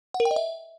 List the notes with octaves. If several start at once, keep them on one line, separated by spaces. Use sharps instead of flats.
F#5
A#4
G5
D#5
E5